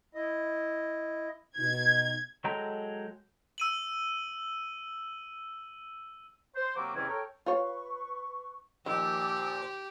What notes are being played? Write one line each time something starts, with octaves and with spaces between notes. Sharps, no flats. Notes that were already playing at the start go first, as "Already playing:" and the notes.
E4 D#5
B2 D#4 G#6
F#3 G#3 A4 G5 A#5
E6 D#7 F#7
C5
C3 F#3 A#3 C4 F#4 D6
E2 C3 D#3 E3 C4 C#4
A4 A#4 C#5 G5
F4 B4 C#5 C#6
A#2 D#3 F3 G4 D6 E6